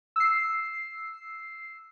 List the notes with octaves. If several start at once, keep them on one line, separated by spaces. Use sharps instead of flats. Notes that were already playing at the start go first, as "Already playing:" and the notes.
E6 C7